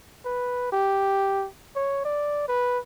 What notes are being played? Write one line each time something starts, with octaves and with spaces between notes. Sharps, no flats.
B4
G4
C#5
D5
B4